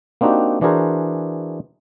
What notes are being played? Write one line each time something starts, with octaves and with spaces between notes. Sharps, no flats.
A#3 C4 D4 D#4 F#4 G4
E3 D4 F#4 G#4 A#4 C5